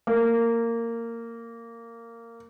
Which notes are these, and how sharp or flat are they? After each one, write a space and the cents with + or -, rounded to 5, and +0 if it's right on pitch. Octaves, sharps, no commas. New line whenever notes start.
A#3 -15